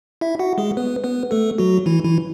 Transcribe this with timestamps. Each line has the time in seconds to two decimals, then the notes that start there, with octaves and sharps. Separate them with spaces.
0.21 E4 E5
0.39 F#4 F#5
0.58 G#3 G#4
0.77 B3 B4
1.04 B3 B4
1.31 A3 A4
1.58 F#3 F#4
1.86 E3 E4
2.04 E3 E4